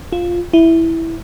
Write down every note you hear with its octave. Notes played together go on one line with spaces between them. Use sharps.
F4
E4